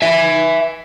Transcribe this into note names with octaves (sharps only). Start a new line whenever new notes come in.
E5 G#5